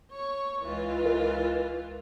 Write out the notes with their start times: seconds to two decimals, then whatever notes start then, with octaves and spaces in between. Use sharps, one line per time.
0.12 C#5 C#6
0.62 C#2 E3 F4
1.06 A#4